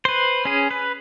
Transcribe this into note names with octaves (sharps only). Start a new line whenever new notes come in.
B4 C5
C#4 G#4
B4